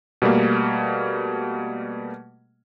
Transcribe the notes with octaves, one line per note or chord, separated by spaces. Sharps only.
B2 G3 A3 A#3